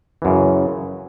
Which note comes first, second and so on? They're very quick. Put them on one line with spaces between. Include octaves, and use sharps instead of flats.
E3 F#2 C#3